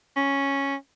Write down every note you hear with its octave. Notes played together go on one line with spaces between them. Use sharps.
C#4